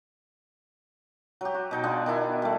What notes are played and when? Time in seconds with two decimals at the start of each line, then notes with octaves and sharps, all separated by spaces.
1.41 F#3 G4
1.54 F#4
1.71 B2 D#4 G5
1.84 B3 D4 F4 G#4
2.06 D#3 D4 E4 G#5
2.42 G3 A3